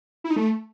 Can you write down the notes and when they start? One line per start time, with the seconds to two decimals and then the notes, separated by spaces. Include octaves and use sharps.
0.24 E4
0.30 D#4
0.36 A3